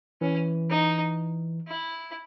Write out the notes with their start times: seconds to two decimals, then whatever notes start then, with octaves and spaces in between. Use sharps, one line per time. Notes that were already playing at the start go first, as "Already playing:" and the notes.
0.21 E3 C#4
0.70 D#4
1.68 E4